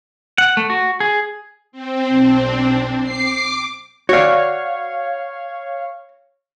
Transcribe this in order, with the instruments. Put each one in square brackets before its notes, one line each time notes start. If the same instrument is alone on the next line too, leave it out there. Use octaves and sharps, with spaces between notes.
[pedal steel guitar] F#5
A3
F#4
G#4
[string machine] C4
[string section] B1 D4
[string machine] D6 [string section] C7
[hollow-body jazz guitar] F#4 D5 [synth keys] C#5 F5